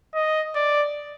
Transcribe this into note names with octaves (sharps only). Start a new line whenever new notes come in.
D#5
D5